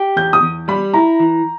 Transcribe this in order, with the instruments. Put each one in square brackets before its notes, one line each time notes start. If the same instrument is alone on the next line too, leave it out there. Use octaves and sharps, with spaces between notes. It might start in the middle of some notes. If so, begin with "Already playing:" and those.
Already playing: [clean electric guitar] G4
[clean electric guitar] E2 [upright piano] G6
[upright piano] D#6
[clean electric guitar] E2
[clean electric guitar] G3 [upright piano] B5
[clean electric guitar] E4 [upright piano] A#5
[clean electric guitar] E3